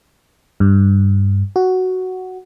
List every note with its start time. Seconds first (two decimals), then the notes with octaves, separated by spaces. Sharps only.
0.60 G2
1.56 F#4